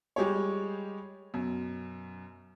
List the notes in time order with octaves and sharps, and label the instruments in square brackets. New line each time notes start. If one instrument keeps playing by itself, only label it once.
[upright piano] G3 G#3 G4 G#4 C#5
F#2 B2